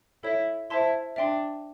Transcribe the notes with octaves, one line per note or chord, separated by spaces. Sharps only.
E4 A4 C#5 E5
E4 C5 E5 A5 C6
D4 E5 G5 C6